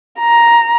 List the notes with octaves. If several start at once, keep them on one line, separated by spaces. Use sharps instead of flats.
A#5